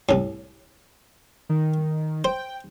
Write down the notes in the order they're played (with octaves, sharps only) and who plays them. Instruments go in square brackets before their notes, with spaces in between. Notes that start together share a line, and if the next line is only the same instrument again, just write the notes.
[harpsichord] C2 A2
[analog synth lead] D#3
[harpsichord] C5 [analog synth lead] G5